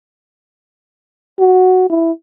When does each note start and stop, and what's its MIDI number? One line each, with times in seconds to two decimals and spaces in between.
1.39 1.87 66
1.90 2.11 64